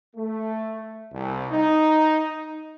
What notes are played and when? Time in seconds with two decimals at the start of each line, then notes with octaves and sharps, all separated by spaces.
0.15 A3
1.12 C2
1.51 D#4